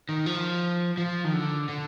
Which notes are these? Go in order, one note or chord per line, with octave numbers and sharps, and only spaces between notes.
D#3
F3
F3
D#3
D3
D3